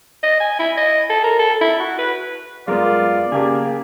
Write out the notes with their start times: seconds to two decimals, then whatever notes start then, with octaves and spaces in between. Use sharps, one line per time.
0.23 D#5
0.40 G#5
0.59 E4
0.77 D#5
1.10 A4
1.24 A#4
1.39 A4
1.61 E4
1.80 F#4
1.98 B4
2.68 F#2 G#3 B3 F4 A#4 D5
3.32 C#3 A#3 G4 G#4 A5